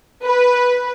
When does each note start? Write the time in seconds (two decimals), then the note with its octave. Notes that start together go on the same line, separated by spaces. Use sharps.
0.24 B4